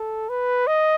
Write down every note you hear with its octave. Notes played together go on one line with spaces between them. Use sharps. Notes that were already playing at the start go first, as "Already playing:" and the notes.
Already playing: A4
B4
D#5